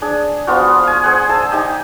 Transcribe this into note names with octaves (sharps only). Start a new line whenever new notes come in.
D4 G#4
F3 B3 F4 F#4
F5 G#5
G#4 C5 F#5
G#5 A5 E6
D#4 G4 G#5